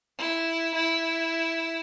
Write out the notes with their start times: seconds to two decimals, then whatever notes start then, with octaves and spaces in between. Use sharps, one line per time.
0.19 E4
0.74 E4